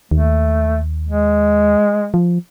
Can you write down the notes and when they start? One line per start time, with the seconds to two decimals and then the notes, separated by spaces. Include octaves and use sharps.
0.11 D#2 A3
1.08 G#3
2.14 F3